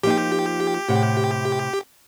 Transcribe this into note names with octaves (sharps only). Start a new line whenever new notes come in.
F3 A#3 D#4 G4
A2 C3 F#5